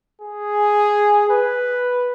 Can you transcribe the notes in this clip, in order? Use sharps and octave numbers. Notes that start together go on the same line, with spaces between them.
G#4
B4